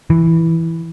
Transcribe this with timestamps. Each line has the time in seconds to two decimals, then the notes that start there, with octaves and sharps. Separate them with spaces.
0.10 E3